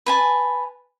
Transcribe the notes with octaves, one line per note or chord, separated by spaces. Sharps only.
B4 G#5 A5